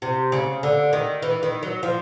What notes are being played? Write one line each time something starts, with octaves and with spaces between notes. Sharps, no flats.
C3
C#3
D3
D#3
E3
D#3
F#3
F3